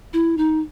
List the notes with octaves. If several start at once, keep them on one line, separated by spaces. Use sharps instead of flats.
E4
D#4